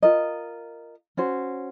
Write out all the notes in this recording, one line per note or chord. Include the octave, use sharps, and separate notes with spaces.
F4 A#4 D#5
C#4 F#4 C5